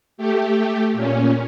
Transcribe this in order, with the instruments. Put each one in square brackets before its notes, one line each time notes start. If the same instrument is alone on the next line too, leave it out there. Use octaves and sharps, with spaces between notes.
[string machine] A3 G4
A#2 C#4